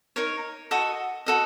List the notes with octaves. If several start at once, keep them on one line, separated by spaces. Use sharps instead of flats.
D#4 A#4 C#5
F#4 A4 D#5
F#4 A4 D#5